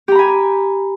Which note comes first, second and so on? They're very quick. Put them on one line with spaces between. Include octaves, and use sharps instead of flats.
G4 A#5 B5 G#5